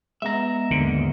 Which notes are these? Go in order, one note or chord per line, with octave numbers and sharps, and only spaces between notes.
G#3 B3 E5 A#5
D#2 G#2 D3